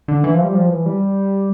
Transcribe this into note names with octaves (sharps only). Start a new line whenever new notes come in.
D3
E3
F3
G3
F3
E3
G3